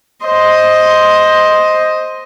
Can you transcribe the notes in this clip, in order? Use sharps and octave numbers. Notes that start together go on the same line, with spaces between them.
C5 D#5